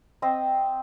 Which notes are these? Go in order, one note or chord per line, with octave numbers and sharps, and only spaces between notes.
C4 C5 D#5